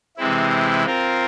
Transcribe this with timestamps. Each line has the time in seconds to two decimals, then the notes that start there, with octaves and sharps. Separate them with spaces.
0.17 C3 E3 G#3 C4 E4
0.85 C4 F4 A#4